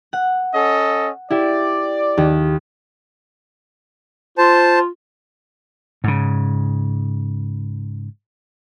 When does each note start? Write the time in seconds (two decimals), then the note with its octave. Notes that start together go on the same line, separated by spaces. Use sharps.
0.13 F#5
0.54 C#4 A4 D#5
1.30 E4 G4 D5
2.17 D#2
4.38 F4 C5 A5
6.04 G#2 C#3